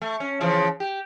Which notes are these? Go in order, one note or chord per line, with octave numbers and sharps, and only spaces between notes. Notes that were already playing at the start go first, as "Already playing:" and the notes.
A3
C#4
C#3 E3 F3
G4